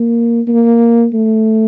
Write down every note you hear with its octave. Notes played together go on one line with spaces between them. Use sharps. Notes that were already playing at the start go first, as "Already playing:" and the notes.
Already playing: A#3
A#3
A3